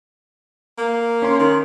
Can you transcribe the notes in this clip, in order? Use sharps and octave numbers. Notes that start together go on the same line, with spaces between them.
A#3
C#4 C6
D#3